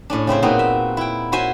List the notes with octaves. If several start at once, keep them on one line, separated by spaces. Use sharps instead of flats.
A2 C#4 D4
C#3 C4 E4 C5
A#2 B3 C4 D#4 F#4
E5
E4 G5
E4 F#4 C5 E5 G#5